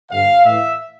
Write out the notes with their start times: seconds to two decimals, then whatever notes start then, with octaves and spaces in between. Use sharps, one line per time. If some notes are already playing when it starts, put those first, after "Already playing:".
0.11 G2 D3 F5
0.44 A2 E3 E5